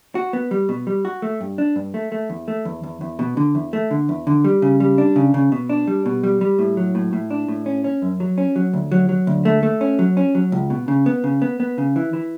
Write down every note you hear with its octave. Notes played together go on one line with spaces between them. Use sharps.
F#4
B3
G3
B2
G3
F#4
A3
G2
D4
G2
A3
A3
E2
A3
E2
E2
E2
B2
D3
E2
A3
D3
E2
D3
G3
C#3
G3
D4
C#3
C#3
B2
D4
G3
B2
G3
G3
A2
F#3
A2
A2
D4
A2
C#4
C#4
F#2
F#3
C#4
F#3
D2
F#3
F#3
D2
A3
A3
C#4
F#3
C#4
F#3
C#2
B2
C#3
B3
C#3
B3
B3
C#3
E3
E3